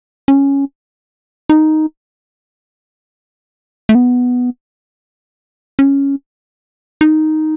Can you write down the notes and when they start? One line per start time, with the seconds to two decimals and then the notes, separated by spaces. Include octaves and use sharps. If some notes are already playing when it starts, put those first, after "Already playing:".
0.28 C#4
1.49 D#4
3.89 A3
3.95 B3
5.79 C#4
7.01 D#4